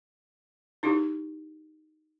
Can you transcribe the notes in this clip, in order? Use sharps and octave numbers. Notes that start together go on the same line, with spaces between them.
D#4 E4 G4 G#4